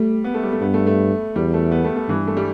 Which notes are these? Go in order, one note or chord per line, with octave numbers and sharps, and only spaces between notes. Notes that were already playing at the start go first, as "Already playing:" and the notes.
Already playing: G3 A3
B3
A3
G3
A3
G2 B3
A3
A3
E2 G3
A3
B3
A3
A3
G2 E3
A3
G3